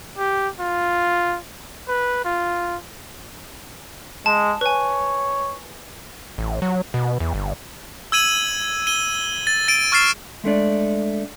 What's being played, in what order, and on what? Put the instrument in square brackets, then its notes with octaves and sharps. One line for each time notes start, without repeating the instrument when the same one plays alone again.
[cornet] G4
F4
B4
F4
[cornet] G#3 [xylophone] A5
[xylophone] B4 G#5 [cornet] C#5
[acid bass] A1
F#3
B2
E2
G1
[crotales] E6 G#6 D#7 F#7
D#7 G7
A6
A6 D7 D#7
C#6 F6 A6 C7 E7
[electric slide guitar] G#3 A3 D4 D5